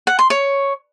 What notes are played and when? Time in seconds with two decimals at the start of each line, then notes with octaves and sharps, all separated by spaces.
0.07 F#5
0.19 C6
0.30 C#5